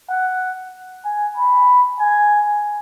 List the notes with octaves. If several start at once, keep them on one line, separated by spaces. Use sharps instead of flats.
F#5
G#5
B5
G#5